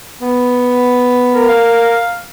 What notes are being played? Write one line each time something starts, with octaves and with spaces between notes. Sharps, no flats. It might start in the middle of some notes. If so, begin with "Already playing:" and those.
B3
A#4
F5